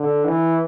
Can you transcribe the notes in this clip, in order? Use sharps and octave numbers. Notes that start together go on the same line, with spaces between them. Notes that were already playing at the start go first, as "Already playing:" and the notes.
Already playing: D3
E3